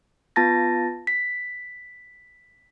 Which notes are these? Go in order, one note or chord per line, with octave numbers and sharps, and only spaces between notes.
B3 F4 A5 A6 A#6
B6